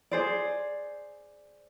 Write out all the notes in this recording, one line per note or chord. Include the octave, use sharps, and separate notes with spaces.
G#4 C5 D5